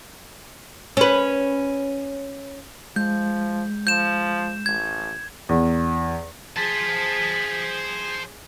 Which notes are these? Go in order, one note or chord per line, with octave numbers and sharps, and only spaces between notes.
C#4 B4
F3 G#3 G6
F3 G6 E7
A1 G#6
E2
G#4 C5 A5 B6